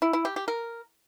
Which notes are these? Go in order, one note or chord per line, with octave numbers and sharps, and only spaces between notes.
E4
E4
G4
G4
A#4